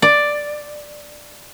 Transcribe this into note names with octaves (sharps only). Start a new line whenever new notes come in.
D5